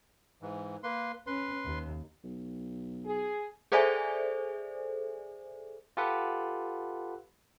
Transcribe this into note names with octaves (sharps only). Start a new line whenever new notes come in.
G#2 E3
A#3 B4 C6
C#4 B4 C6
D#2
B1
G#4
G#4 A4 C5 D5 E5 G#5
F4 G4 A4 B4 F#5